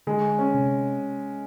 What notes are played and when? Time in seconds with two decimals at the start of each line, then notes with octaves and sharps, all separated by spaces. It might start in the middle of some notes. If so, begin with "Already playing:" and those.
0.07 D3 G#3
0.39 C#4
0.54 C3